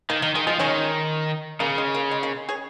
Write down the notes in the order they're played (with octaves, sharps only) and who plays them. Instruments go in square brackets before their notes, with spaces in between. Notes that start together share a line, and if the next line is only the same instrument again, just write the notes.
[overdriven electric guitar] D#3 [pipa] A#3
[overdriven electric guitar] D#3 [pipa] A#3
[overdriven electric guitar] D#3 [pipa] G#3
[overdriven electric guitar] F3 [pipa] G#3
[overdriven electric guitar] D#3 [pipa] G#3 C#4
[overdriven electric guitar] C#3 [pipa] A#3
[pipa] G#3
A#3
G#3
A#3
G#4 C#5